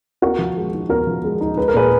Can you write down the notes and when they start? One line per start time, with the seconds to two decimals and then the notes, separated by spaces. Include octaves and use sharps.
0.22 B3 F#4 A#4
0.39 F3
0.57 G#3
0.73 D#4
0.89 B3 F#4 A#4
1.07 F3
1.24 G#3
1.41 D#4
1.57 G#3 B4
1.68 A#4
1.74 A#2 G#4 B4